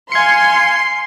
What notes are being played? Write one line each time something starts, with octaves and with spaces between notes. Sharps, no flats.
F5 G#5 C6 G#6 C7 C#7